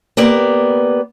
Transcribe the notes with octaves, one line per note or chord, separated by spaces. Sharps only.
A#3 B3 G4 D5